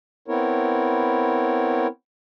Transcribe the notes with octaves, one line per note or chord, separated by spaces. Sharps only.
B3 C4 E4 A#4 C#5